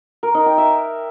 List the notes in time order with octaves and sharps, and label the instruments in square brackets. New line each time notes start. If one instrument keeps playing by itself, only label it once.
[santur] A#4
D#4
G5
E5